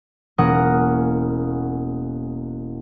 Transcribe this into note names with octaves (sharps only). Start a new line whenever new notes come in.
E1 A#3 C#4 A#4 F#5 D#6